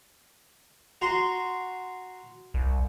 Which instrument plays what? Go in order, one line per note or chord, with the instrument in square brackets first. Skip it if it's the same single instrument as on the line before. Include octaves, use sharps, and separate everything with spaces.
[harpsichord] F#4 A#5 C6
[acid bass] C2